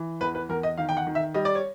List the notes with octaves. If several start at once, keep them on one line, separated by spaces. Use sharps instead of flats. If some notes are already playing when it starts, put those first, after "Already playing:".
Already playing: E3
E2 B4
B4
E2 A#4
D#5
D#3 F5
G5
F#5
D#3
E5
G3 D#5
D5
C#5